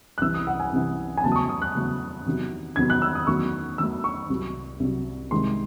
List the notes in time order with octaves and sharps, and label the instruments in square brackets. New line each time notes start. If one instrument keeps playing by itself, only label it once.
[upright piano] F#6
C2 C3 E3 E6
D#6
F#5
G#5
C2 C3 E3
G#5
E2 C#3 F#3 A3 A5
D#6
C#6
D#6
F#6
E2 C#3 F#3 A3
E2 C3 D#3 F#3
E2 C3 D#3 F#3 G#6
F#6
E6
D#6
E2 D#3 F#3 A3 C#6
E2 D#3 F#3 A3 E6
C#6
C2 C3 F#3
C2 C3 F#3
C2 C3 D#3 G#3 C6